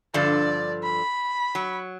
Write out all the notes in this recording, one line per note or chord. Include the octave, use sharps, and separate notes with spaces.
G2 D3 F3 D5
B5
F#3